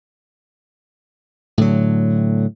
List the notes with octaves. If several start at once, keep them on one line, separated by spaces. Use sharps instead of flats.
A2 D3 F#3